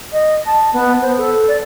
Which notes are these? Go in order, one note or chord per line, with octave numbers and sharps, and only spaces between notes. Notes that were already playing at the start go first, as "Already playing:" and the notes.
D#5
A5
B3
C5
A4
D5